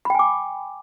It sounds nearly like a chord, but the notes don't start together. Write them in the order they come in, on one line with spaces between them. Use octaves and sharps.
B5 G5 G#5 D6